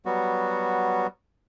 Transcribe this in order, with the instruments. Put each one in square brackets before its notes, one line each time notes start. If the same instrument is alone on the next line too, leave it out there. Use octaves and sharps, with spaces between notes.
[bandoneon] F#3 G3 B3 F#4